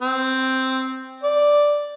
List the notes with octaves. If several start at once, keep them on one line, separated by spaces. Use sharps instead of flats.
C4
D5